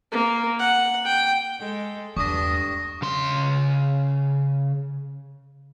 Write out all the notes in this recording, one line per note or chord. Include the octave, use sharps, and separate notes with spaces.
A#3
F#5
G5
G#3 A4
E2 G2 D4 C#6 D#6 A#6
C#3 C6